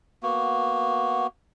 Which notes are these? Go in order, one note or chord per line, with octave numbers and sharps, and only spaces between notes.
A#3 B3 F#4